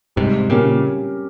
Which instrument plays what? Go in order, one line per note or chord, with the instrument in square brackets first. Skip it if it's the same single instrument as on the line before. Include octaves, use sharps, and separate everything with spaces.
[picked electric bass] G#2 C3 [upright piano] G3
[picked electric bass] A#2 C#3 [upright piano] C#4 G4 A#4